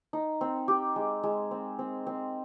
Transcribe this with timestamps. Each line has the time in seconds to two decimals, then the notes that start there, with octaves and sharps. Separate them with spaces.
0.13 D#4
0.41 C4
0.68 G4
0.96 G#3
1.23 G#3
1.51 C4
1.79 C4
2.07 C4